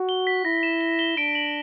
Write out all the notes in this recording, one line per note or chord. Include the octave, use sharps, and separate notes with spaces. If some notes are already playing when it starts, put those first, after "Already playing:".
Already playing: F#4
G7
B6
E4 A#6
E7
G7
G7
D4 D7
F#7